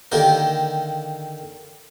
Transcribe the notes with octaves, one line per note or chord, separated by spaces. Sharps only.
D3 D#3 A#3 G4 A#4